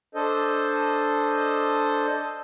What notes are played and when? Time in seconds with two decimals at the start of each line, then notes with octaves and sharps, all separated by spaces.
0.15 D4 A4 C5 D#5